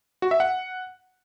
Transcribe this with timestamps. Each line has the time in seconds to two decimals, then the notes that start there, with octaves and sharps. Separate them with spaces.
0.22 F#4
0.31 E5
0.40 F#5